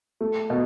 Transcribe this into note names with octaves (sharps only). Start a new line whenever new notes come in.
A3
B2